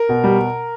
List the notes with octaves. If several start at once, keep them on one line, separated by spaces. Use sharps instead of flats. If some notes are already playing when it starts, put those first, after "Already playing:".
Already playing: A#4
B2
G3